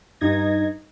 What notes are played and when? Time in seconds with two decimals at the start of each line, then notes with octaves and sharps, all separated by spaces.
0.21 G2 D#4 G#6 A#6